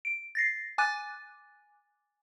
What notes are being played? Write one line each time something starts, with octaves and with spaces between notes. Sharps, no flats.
D7
A6 A#6 C7
G#5 D6 F#6 A6 D#7